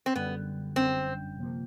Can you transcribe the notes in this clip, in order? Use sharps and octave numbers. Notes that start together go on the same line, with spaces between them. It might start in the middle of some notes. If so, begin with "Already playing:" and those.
C4
F#2 D3 G3 B3
G1 F#2 D3 G3 C4
C3 F3 A#3